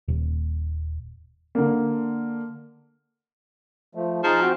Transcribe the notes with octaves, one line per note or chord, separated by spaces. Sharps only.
D#1
D3 A#3
F3 A3
F3 D#4 G#4 A5
C4 F#4 G5